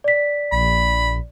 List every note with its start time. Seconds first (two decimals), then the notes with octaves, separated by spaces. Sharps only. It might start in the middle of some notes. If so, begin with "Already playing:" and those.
0.04 D5 B6
0.52 A#1 B5